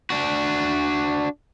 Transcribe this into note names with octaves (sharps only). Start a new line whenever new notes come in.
D4 F#4